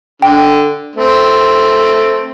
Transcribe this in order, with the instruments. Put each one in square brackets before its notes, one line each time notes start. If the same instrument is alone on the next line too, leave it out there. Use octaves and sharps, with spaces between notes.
[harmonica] D3 [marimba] G5
[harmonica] A3 C4